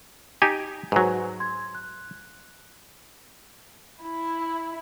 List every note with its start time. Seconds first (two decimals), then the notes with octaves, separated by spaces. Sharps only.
0.42 D#4 G4 G#5
0.92 G#2 F#3 B4 C5 G#5
1.40 C6 G#6
1.75 F#6
4.02 E4